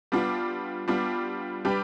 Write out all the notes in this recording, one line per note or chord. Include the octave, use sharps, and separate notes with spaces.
G3 B3 D4 F4
G3 B3 D4 F4
G3 D4 G4 B4